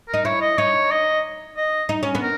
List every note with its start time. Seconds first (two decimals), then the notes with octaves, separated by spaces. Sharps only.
0.08 A#4
0.14 D#4
0.25 E4 C#5
0.41 D#5
0.58 D#4 C#5
0.91 D#5
1.56 D#5
1.89 D#4
2.03 C#4
2.15 B3
2.22 A#4